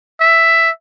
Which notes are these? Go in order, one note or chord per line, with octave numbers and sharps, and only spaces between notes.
E5